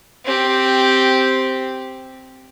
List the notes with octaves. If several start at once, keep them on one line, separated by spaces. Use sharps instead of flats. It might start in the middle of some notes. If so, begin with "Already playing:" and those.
C4 G4